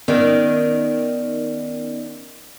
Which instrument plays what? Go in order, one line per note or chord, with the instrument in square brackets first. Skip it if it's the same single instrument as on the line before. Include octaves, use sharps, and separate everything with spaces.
[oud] D#3 [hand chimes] B3 C#4 D5